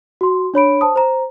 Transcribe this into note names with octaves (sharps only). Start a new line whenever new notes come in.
F#4 C6
D4 C#5 B5 D7
C5 A5 D#6
C5 A#5